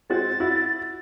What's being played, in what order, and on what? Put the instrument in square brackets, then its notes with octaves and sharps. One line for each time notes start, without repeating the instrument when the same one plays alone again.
[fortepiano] G#3 C4 F#4 [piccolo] A6
[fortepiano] E4 F#4